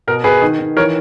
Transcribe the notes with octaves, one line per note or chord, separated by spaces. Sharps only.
B2 A#4
B2 G#4 B4
D#3
D#3
E3 A#4 C#5